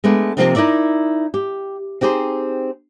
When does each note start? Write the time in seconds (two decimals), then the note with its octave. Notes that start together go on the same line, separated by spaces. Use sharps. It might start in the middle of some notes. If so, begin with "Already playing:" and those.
0.04 G#3 A3 B3 D4
0.37 C3 D#3 F3 A#3 C4 D#4
0.55 D#4 E4 A#4 D5 E5
1.34 G4
2.01 C4 D#4 G4 G#4 C5